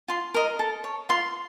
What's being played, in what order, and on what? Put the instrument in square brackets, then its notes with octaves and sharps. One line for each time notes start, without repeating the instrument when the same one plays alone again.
[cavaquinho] F4 C6
A#4 D#5
A4
C#5
F4 C6